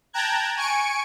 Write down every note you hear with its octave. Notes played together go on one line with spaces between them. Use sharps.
G5 A5 A#5 F#6 G#6
G#5 C#6 C#7 D7